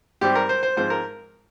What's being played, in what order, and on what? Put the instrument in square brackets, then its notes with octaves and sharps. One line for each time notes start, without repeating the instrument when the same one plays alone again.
[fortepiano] G#2 G3 C4 G4
A#4
C5
C5
G#2 F3 G#3 C4 C5
A#4